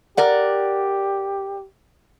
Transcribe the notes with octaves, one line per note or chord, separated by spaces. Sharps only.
G4 A#4 D5 F#5